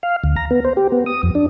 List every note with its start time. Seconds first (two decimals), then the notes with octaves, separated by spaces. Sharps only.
0.03 F5
0.24 D2
0.36 A#5
0.51 B3
0.65 C5
0.77 G4
0.92 B3
1.06 D#6
1.23 F2
1.35 D4